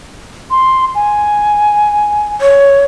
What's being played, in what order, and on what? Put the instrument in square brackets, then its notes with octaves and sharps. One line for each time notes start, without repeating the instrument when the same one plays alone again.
[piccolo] C6
G#5
[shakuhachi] C#5